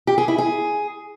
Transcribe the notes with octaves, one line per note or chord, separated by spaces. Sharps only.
G4
G#4
E4
G#4